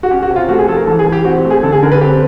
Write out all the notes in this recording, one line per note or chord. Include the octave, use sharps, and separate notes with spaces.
F#4
C#4 G4
F#4
C3
F4
A3 F#4
G#4
F3 A4
A#4
E3 A4
G#4
E3
G4
C4 F#4
G4
A3
G#4
D3 A4
G#4
D3 A#4
B4
C4 G4